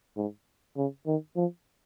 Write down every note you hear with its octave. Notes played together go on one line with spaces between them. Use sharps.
G#2
C#3
D#3
F3